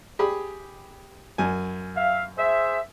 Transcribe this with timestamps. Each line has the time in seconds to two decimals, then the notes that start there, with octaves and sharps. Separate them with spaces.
0.19 G4 G#4 B5
1.38 F#2 G#5
1.96 E5 F5
2.38 G#4 C5 E5